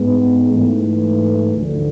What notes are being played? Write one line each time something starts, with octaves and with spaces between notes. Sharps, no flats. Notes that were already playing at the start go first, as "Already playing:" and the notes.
Already playing: G#2 G#3 B3
G#2 E3 A3
D2 D3 F3